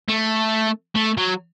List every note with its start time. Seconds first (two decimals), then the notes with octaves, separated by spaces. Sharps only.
0.09 A3
0.96 A3
1.17 F#3